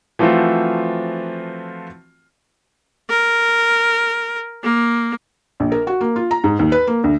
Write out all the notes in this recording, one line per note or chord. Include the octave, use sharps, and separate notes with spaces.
E3 F3 A3 C4 F4 F#4
A#4
A#3
A#1
A#4
F#4
A#3
F4
A#5
G#2
D#2
B4
A#3
D2